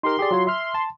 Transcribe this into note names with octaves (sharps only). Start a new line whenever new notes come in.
D#4 G4 A#4 C6
G4 G#4 D5
F#3 F4 C#5
E5 C6 F6
A5